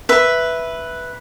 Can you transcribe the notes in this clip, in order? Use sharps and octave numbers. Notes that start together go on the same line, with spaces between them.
B4 E5